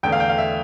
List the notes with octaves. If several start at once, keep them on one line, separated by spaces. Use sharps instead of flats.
E2 D3 A3 G5
F5
G5
F5
E5